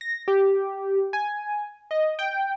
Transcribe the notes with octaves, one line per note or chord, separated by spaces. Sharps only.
A#6
G4
G#5
D#5
G5